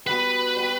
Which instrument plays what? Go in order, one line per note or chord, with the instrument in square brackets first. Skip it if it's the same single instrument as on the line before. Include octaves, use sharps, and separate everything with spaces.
[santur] G3 B3 F#4 [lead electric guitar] B4
[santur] G3 B3 F#4